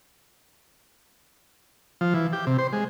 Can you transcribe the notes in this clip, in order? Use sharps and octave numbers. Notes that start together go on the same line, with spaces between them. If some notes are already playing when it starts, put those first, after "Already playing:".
F3
E3
G4
C3
C5
G#3